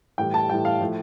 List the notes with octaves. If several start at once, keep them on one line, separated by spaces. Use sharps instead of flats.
A2 E3 G3 G5
A5
A2 E3 G3 G5
F5
A2 F3